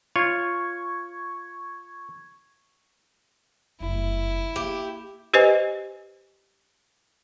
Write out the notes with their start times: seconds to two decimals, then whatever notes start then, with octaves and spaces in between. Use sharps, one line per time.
0.16 F4 C#5 C#6 G#6
3.80 F#1 G2 E4
4.56 A#3 G4
5.34 G4 B4 C5 D#5 G#5